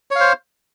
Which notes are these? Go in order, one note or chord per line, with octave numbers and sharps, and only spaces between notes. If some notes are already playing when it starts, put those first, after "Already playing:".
C5 C#5 F5